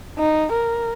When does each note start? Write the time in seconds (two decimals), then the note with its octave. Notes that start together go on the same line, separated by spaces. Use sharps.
0.18 D#4
0.52 A#4